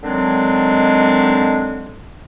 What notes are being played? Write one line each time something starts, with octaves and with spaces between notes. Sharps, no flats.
D3 D#3 F#3 G#3 C4 D4